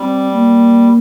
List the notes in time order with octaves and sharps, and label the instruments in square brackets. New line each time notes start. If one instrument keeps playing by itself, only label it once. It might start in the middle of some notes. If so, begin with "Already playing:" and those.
Already playing: [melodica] G3 [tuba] C4
[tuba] A#3